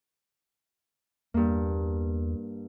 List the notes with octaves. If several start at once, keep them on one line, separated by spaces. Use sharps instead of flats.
E2 G2 A#3